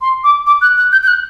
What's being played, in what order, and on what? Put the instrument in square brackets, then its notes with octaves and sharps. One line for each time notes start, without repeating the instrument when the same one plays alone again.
[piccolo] C6
D6
D6
F#6
F#6
G6
G6
F#6